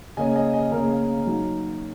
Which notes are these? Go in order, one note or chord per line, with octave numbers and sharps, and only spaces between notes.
C#3 A#3 C#4 D#5 G#5
D#5 G#5
D#5 G#5
C#3 A#3 C#4 A#4 D#5
F#3 D#4